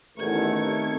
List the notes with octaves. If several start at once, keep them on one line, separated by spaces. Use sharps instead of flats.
A1 E2 D#3 A3 A#4 C#6 G#6
C4 G4